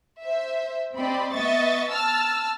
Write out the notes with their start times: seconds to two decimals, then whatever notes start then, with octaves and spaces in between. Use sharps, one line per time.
0.23 C5 E5
0.96 C4 G4 D5 D#5 B5
1.32 B3 D#5 E5 C#6 A6
1.90 A5 E6 F6 A6